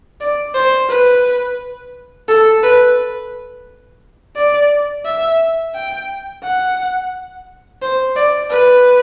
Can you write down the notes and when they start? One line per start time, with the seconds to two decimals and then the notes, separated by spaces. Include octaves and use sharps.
0.21 D5
0.54 C5
0.89 B4
2.28 A4
2.63 B4
4.36 D5
5.05 E5
5.74 G5
6.43 F#5
7.82 C5
8.16 D5
8.50 B4